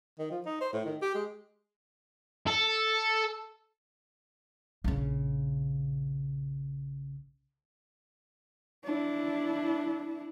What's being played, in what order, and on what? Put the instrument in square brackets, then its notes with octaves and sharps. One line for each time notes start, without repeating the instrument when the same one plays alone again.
[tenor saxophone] D#3
F3
D#4
C5
A2
D#3
G4
G#3
[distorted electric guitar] A4
[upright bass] A#1 C#3
[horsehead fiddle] D4 E4